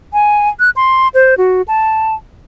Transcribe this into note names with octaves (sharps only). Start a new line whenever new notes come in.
G#5
F#6
C6
C5
F#4
A5